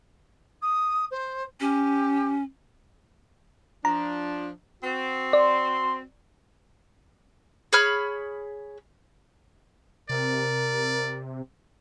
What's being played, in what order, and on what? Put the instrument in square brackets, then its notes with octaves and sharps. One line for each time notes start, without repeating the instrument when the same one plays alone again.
[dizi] D#6
C5
[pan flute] C#4 [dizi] G4
[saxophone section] F3 D4 [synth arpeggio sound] A#5
[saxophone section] C4 F#4
[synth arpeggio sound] D5 [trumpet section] C6
[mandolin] G#4 C#5 B5 F6
[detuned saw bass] C3 [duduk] A#4 [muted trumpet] D5